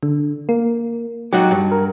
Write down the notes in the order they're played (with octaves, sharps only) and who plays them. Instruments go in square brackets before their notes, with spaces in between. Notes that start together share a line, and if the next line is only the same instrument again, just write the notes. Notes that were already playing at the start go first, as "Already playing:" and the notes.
[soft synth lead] D3
A#3
[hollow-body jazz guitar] F#3 D#4 F#4 [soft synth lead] G4
[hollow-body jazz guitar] G2
[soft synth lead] A#4